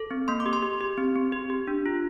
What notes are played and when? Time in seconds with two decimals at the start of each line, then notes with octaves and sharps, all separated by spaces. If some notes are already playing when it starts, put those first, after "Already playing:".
Already playing: A4
0.11 C4
0.28 A#3 C6
0.40 D6
0.46 G4
0.53 C6
0.63 G4
0.81 G4
0.98 C4
1.16 C4
1.32 G4
1.50 G4
1.67 D4
1.86 F4